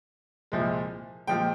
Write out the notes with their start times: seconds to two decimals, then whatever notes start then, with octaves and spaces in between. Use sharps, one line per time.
0.52 C2 A#2 F3 G#3
1.27 A#2 F3 G#3 G5